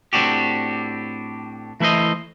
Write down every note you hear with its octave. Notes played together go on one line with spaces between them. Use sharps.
A2 C4 D4 F#4 G4
E3 A3 E4 C5 D#5